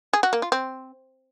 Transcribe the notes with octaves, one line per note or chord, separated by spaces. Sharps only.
G#4
F#4
A#3
F4
C4